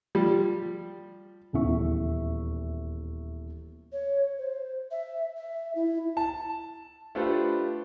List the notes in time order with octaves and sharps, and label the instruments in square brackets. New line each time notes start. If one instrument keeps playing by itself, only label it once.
[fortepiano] F3 G3
[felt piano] D#1 E2 C#4 E4 E5 C#6
[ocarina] C#5
C5
E5
E5
E4
[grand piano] A5
A3 D4 F4 G4 B4 C5